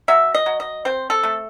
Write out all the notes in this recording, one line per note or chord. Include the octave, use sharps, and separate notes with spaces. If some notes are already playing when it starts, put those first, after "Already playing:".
F#3 E5
D#5
F#3
D#5
C4 C5
A4
A3